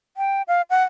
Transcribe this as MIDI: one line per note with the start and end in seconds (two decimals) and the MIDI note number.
0.17 0.42 79
0.48 0.62 77
0.70 0.84 78